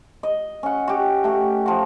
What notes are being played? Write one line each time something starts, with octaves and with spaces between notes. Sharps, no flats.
D#5
C#4 F#5
F#4 G4
A3 G4
F3 F#4